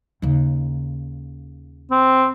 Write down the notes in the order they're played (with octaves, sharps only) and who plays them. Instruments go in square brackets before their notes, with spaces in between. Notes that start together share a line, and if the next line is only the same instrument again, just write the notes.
[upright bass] D#2 C#3
[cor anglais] C4